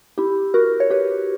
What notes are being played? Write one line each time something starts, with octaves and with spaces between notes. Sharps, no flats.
E4 G4
F#4 A#4
C#5
G4 B4